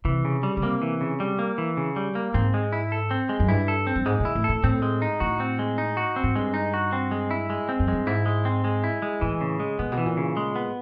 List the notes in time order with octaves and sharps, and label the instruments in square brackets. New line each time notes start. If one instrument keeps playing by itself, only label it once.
[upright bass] C3 [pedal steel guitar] E3
[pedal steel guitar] C#3
G3
[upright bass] C#3
[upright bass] C3 [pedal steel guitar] A#3
[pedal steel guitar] E3
C#3
G3
A#3
E3
C#3
G3
A#3
[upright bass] G#2 [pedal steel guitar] C4
[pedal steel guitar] G#3
E4
A4
C4
G#3
[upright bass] F#2
[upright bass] G2 [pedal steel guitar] E4
[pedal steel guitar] A4
C4
[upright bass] G2
[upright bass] G#2 [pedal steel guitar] G#3
[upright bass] A#2 [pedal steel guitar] E4
[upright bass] A2
[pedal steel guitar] A4
[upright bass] A2
[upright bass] A2 [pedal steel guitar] C4
[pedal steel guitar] G#3
D#4
[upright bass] A2 [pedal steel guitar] F#4
[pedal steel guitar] C4
G#3
D#4
F#4
C4
[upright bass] G#2
[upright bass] G2 [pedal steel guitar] G#3
[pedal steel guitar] D#4
F#4
C4
G#3
E4
G#3
C4
[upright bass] F#2
[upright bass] G2 [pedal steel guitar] G#3
[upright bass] G#2 [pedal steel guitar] E4
[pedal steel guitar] G#3
C4
G#3
E4
G#3
[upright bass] A2 [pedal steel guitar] E3
[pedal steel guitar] C#3
G#3
[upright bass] A#2 [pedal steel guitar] B3
[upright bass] B2
[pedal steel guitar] E3
[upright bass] A#2
[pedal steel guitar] C#3
G#3
B3